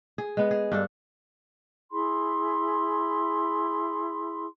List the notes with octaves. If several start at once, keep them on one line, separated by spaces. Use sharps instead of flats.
G#4
G#3 B3
G#4
G2 D4 A4
E4 G#4 B5 C6